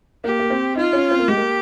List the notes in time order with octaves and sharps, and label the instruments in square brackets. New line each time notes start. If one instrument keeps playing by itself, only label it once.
[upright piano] A#3 [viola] G4
[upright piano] A#3
C4
[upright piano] D#4 [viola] F4
[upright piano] C#4
C4
A#3
[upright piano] G#3 [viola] G4
[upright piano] A#3